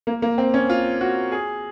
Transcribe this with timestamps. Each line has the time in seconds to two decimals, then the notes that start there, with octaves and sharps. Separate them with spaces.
0.07 A#3
0.22 A#3
0.38 C4
0.54 C#4
0.69 F4
1.01 F#4
1.32 G#4